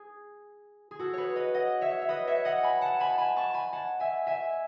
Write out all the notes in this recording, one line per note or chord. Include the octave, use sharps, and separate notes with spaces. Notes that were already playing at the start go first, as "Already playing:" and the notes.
Already playing: G#4
G#4
F#4 A4
G#4 B4 C#5
B4 D#5
D#5 F#5
C#5 E5
E5
B4 D#5
C#5 E5
D#5 F#5
G#5 B5
F#5 A5
G#5 B5
A5
G#5 B5
A5 C#6
G#5 B5
F#5 A5
E5 G#5
E5 G#5